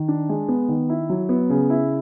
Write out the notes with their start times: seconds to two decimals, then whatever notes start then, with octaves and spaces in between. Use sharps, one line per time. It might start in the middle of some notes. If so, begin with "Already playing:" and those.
Already playing: D#3
0.08 D4
0.29 G#3
0.49 B3
0.69 D#3
0.89 E4
1.10 F#3
1.29 B3
1.49 C#3
1.70 E4